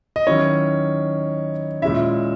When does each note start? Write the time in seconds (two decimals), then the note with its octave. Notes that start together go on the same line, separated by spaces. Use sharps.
0.16 D#5
0.27 D#3 F#3 C#4 E4 C#5
1.82 A#2 G#3 C#4 E4 E5